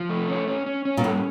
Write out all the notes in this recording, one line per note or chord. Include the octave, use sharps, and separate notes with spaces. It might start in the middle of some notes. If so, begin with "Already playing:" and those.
Already playing: F3
A3
C#4
C#4
C#4
C#4
A#2
A2 G3